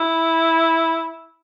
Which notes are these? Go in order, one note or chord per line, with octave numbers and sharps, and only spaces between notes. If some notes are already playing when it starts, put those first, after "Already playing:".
Already playing: E4